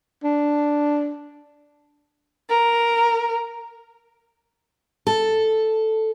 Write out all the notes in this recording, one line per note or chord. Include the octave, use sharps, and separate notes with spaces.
D4
A#4
A4